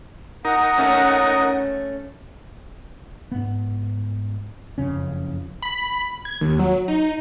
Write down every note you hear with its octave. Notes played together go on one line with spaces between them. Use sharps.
D#4 A#4 F#5
A3 C#4
G#2 B3
F#1 F2 C#3 C#4
B5
G#6
D#2
F#3
D#4